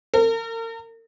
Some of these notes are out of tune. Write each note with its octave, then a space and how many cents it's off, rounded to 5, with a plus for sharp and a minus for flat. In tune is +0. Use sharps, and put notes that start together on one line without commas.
A#4 -40